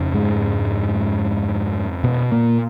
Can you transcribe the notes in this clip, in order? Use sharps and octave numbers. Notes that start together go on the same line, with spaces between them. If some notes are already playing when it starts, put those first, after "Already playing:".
Already playing: F2 C#3
G#2 G#3
B2 B3
A#2 A#3